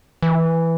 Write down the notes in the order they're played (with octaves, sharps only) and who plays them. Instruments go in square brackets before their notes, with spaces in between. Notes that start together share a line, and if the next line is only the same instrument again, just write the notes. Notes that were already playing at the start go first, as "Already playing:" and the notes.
[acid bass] E3